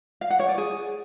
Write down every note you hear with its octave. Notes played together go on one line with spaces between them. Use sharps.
F5
F#5
C#5
D5
G#4